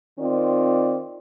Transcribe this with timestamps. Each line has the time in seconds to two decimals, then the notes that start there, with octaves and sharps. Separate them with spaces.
0.19 D#3 C4 F4 D5